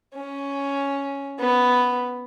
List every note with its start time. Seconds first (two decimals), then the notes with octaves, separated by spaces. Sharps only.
0.15 C#4
1.39 B3